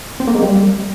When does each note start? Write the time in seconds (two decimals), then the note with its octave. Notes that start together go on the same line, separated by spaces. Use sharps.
0.20 C4
0.27 A#3
0.35 G#3
0.42 G3